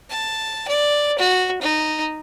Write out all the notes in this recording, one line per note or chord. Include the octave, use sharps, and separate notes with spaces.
A5
D5
F#4
D#4